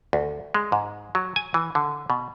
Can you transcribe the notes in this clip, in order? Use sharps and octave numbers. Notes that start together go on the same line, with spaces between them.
D2
G#3
G#2
F#3
G#5
E3
D3
B2